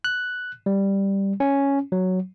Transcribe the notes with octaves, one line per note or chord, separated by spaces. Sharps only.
F#6
G3
C#4
F#3